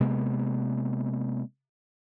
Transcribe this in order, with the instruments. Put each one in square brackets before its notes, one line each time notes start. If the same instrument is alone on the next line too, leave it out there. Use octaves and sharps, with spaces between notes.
[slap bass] C3 G#3 A#3 B3